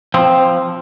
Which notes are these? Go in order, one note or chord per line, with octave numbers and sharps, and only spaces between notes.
F3 C4